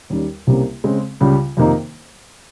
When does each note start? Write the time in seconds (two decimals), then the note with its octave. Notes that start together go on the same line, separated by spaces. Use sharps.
0.10 D#2 D#3 G3 C#4
0.47 C2 C3 G3 A#3 C#4
0.84 C#3 G#3 C4
1.20 C#2 C#3 G3
1.57 F2 C3 D#3 A#3 D#4